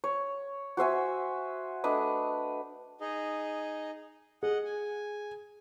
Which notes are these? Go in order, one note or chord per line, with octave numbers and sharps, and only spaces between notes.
C#5
F#4 C5 E5 G#5
A3 D4 B4 D#5
D#4 G#4 D#5
G#4 D#5 F#5
G#5